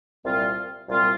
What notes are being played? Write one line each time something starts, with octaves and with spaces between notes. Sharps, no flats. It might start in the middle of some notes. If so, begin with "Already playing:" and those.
C2 A#2 G3 C4 F4
C2 A#2 G3 C4 F4